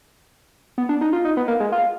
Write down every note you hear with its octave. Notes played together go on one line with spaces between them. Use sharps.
B3
D4
D#4
F4
D#4
B3
A#3
G#3
F4